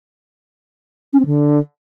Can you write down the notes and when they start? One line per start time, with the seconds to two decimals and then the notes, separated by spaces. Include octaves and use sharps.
1.13 C#4
1.19 C4
1.26 D3